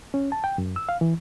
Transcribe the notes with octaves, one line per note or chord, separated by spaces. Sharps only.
C#4
A5
G5
F#2
E6
F5
E3